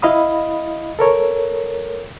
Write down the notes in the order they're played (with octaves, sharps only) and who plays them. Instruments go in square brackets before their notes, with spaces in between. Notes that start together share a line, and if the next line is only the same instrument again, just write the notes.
[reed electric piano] E4 D#5 F5 B5 D#6
A4 A#4 C#5